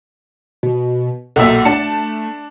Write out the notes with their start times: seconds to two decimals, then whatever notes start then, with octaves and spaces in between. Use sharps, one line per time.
0.63 B2
1.36 B1 A#2 A4 E5
1.65 A3 D4 A5 C#7